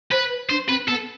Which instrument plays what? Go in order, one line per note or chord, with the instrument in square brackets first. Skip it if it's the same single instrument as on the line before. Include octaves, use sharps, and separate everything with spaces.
[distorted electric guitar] B4 [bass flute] C5
[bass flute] B4
[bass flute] D4 [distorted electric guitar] C5
[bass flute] C4 [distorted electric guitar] B4
[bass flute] B3 [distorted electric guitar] A4